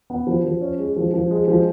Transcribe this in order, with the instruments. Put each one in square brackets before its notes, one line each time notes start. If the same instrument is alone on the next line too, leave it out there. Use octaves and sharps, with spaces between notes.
[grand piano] B3
F3
F3
C#4
G#3
F3
F3
G#3
F3